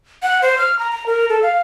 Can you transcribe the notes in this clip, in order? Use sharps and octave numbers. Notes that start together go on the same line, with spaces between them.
F#5
C5
F6
A#5
A#5
A#4
A4
F5